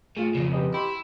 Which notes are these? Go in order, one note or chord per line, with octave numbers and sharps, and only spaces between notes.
A2 F4 G#4
F2 C#3
G4 B4 D#5
E4 G4 C6